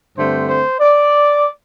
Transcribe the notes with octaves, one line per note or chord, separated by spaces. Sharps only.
G2 D3 A3 C4 C5
C5
D5